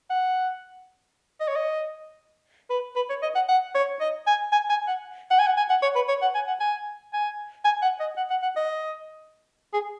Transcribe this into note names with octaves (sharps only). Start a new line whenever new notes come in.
F#5
D#5
C#5
D#5
B4
B4
C#5
D#5
F#5
F#5
C#5
D#5
G#5
G#5
G#5
F#5
F#5
G#5
F#5
G#5
F#5
C#5
B4
C#5
F#5
G#5
F#5
G#5
G#5
G#5
F#5
D#5
F#5
F#5
F#5
D#5
G#4